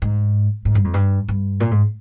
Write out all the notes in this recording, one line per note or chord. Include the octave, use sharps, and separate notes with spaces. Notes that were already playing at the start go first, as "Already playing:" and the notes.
G#2
G#2
G2
F2
G2
G2
A#2
G#2